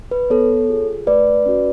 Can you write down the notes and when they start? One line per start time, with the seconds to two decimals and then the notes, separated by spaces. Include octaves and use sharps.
0.11 B4
0.30 B3 A4 C#5
0.69 F4 G#4
1.07 A3 B4 D5
1.46 C#4 F#4